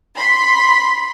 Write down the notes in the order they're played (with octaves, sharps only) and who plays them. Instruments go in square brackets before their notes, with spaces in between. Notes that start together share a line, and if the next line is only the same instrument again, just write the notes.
[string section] B5 C6 B6